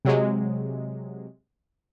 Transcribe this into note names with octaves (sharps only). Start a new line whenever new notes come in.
C3 F#3 G#3